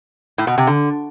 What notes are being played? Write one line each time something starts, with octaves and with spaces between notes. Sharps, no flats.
A2
B2
C3
D3